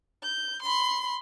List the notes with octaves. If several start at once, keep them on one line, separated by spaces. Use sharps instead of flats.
G6
B5 C6